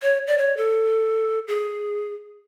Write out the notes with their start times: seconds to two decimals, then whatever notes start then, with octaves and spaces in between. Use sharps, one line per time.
0.02 C#5
0.27 D5
0.38 C#5
0.57 A4
1.48 G#4